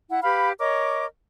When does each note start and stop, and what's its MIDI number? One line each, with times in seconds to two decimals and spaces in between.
0.09 0.21 64
0.09 0.21 78
0.23 0.51 67
0.23 0.51 71
0.23 0.51 77
0.23 0.51 83
0.59 1.05 70
0.59 1.05 73
0.59 1.05 75
0.59 1.05 86